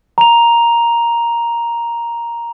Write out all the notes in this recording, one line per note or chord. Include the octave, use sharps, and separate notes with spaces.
A#5 F7